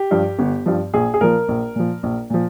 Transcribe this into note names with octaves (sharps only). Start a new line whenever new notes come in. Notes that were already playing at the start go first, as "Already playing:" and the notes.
Already playing: G4
G2 F3
G1
G2 F3
A#1 G#4
G#4
A#2 F3 A#4
A#1
A#2 F3
A#1
A#2 F3